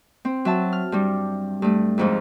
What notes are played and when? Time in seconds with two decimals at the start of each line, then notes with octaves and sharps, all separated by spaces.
0.25 C4
0.45 F#3 E5 A5
0.73 F6
0.92 G2 G3
1.62 G2 A3
1.98 F2 G#2 F3